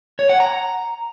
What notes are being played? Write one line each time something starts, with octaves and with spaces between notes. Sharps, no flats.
C#5
F#5
A#5